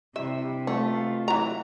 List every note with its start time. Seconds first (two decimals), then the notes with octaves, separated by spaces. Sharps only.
0.16 C3 G3 D4 E4 E5
0.67 B2 A3 D#4 F4
1.28 E3 F#3 A#3 A#5